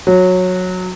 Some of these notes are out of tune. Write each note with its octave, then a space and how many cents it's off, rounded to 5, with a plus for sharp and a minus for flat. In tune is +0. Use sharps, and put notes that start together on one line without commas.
F#3 -15